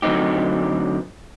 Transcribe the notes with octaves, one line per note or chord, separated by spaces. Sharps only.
D3 F#3 A3 C4 D#4 G4